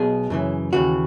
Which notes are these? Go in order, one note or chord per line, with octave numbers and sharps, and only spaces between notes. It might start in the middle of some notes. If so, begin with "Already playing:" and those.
Already playing: B1 B2 G#4
F#2 C#3 E3
D#2 C#3 E3 F#4